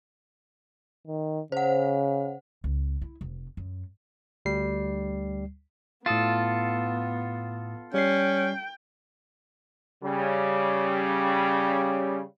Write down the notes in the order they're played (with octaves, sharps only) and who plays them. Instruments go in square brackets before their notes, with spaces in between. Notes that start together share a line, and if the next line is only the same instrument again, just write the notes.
[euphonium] D#3
[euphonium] C#3 [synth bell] C5 F#5
[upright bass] C#2
E4
F1
F#2
[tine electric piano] D2 G3 C7
[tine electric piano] A2 D#6 A6 [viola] B3 [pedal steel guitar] F4 A4
[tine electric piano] G3 C7 [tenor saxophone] C#4 [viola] G5
[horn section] C#3 G3